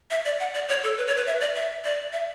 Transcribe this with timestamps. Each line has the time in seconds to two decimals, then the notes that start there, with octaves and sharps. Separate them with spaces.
0.11 E5
0.25 D5
0.40 F#5
0.54 D5
0.69 C#5
0.84 A4
0.98 B4
1.07 C#5
1.17 B4
1.27 E5
1.41 D5
1.55 E5
1.84 D5
2.13 E5